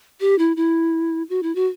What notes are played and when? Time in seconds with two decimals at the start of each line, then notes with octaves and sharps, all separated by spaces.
0.21 G4
0.39 E4
0.57 E4
1.30 F#4
1.43 E4
1.55 F#4